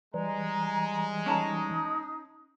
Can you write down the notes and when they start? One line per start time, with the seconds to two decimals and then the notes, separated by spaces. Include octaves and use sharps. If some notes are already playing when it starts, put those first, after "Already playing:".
0.14 E3 G3 G#3 A#5
1.26 C#4 D#4 A5 A#5